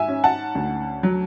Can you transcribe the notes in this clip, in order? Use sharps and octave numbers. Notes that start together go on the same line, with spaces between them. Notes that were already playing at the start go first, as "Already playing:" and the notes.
Already playing: G#2 E5 G#5
C#4
F#5 A5
D2
F#3